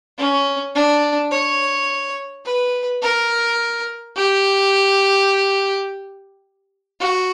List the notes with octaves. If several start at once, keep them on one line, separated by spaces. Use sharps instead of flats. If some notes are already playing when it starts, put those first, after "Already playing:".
C#4
D4
C#5
B4
A#4
G4
F#4